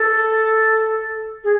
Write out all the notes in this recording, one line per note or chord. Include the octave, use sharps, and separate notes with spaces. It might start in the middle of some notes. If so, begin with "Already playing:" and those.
Already playing: A4
G#4